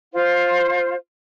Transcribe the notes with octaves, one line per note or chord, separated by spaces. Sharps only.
F4 C5